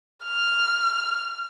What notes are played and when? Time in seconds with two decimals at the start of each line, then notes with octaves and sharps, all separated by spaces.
0.24 F6